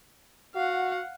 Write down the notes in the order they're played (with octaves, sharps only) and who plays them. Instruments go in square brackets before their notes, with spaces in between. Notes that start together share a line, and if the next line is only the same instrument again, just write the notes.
[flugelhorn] F#4 [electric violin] F5 F#5